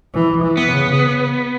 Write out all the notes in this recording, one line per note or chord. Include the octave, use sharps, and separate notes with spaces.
E3
E3
B3
C#3